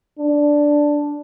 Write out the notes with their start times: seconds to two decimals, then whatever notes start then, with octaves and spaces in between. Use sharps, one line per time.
0.19 D4